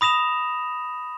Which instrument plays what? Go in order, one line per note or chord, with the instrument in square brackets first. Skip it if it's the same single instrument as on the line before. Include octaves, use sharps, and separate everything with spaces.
[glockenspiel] B5 D#6 A#6 E7 F7